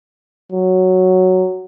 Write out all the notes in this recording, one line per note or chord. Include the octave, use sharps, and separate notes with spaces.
F#3